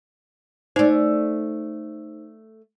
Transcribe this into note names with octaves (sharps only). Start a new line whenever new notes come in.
A3 D#4 C5 D5